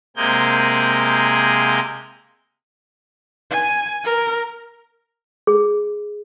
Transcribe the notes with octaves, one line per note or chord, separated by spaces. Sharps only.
C3 G#3 A#3 G#4 G6
G#5
A#4
G#4